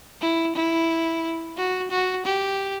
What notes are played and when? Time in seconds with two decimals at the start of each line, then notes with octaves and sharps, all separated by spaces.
0.22 E4
0.56 E4
1.57 F#4
1.91 F#4
2.26 G4